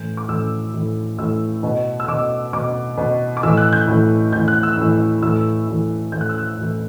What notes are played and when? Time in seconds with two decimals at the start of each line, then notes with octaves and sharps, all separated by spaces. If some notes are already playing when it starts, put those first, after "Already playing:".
Already playing: A2 E3 G6
0.17 D6
0.29 A2 E3 E6
0.74 A2 E3
1.18 A2 E3 E6
1.63 B2
2.00 E6
2.08 B2 D6
2.53 B2 D6
2.98 B2
3.37 D6
3.43 A2 E3 E6
3.57 F#6
3.73 G6
3.87 A2 E3
4.32 A2 E3 G6
4.48 F#6
4.63 E6
4.77 A2 E3
5.22 A2 E3 E6
5.67 A2 E3
6.12 A2 E3 G6
6.21 F#6
6.29 E6
6.38 F#6
6.58 A2 E3